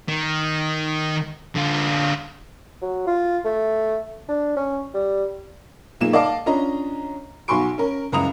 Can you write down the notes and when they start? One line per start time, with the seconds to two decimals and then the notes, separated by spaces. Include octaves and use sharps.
0.09 D#3
1.55 D3 F4
2.82 F#3
3.07 F4
3.45 A3
4.29 D4
4.57 C#4
4.94 G3
6.00 B1 G#3 A#3 F4 E7
6.13 D5 D#5 F5 A5 D6
6.46 C#4 D4 F4 D#5 A#5
7.48 B1 F#4 G#5 C6 C#6 D7
7.78 C#4 A#4
8.12 F#1 C#2 A#5 D#6 F7